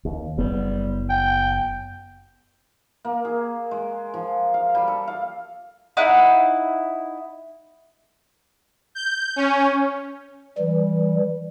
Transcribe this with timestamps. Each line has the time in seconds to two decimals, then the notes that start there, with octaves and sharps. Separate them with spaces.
0.05 D#2
0.38 F#1 G3 B3
1.10 G5
3.05 A#3
3.25 G#4
3.71 G#3
4.14 F3
4.54 F5
4.75 G3
4.88 A4
5.08 F5
5.97 D#4 E4 F#5
8.95 G6
9.36 C#4
10.58 E3 G3